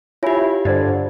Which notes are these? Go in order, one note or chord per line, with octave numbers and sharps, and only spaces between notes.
E4 F4 G4 C#5 E5 G#5
G2 D3 C5 D5 D#5